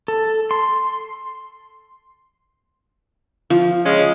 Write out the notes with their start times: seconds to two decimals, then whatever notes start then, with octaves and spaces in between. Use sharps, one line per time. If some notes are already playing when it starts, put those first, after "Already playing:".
0.08 A4
0.51 C6
3.50 F3
3.86 C#3 G#3 C#4